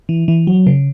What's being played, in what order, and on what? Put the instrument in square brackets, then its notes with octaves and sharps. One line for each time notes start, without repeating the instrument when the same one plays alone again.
[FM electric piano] E3
E3
F#3
C#3